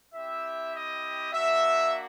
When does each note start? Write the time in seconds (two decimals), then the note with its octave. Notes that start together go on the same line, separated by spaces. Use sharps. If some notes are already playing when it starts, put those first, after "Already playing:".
0.14 C4 E4 G4 E5
0.74 D#5
1.33 A#3 D4 F#4 E5